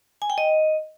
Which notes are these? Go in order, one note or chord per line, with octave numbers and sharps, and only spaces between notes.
G#5
G5
D#5